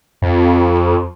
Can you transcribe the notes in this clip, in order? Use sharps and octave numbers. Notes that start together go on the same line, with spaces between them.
F2